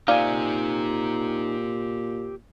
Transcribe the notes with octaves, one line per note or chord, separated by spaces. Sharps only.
A#2 D#4 G4 C5 D5 F5 G#5